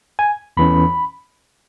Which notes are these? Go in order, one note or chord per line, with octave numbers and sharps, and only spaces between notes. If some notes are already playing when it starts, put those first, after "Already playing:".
G#5
E2 E3 C#4 B5